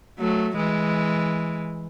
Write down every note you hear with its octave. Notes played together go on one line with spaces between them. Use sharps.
F#3 A3
E3 G#3